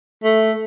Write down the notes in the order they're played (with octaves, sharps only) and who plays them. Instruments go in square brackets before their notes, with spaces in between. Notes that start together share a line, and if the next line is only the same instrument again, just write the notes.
[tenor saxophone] A3